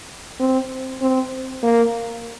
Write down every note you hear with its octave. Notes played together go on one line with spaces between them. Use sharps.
C4
C4
A#3